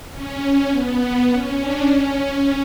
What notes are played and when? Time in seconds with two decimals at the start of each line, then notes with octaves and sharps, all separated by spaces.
0.11 C#4
0.70 B3
1.29 C#4
1.59 D4
1.88 C#4